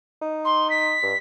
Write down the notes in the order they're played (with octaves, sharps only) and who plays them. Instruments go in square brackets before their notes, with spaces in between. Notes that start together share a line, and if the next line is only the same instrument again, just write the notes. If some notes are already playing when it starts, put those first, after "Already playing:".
[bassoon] D#4
[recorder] C6
B6
[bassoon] G2